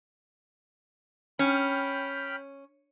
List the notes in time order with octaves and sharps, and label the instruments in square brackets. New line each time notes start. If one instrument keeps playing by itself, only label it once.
[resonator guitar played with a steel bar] C#4 [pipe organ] G5 B5 F6